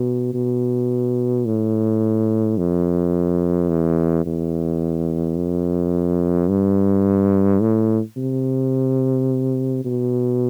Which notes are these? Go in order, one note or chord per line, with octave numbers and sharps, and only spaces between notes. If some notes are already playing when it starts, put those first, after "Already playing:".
Already playing: B2
B2
A2
F2
E2
E2
F2
G2
A2
C3
B2